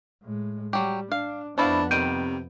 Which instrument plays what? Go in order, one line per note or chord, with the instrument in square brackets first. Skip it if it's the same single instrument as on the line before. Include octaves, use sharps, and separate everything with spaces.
[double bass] A2 G#3
[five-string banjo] F#3 G4 [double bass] G3
[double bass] D4 [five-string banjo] F5
[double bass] F2 B3 [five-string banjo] A3 E4 F5 [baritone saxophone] D4 [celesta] C5 B5
[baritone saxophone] C3 [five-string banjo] D#3 G3 [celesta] G6 D7 D#7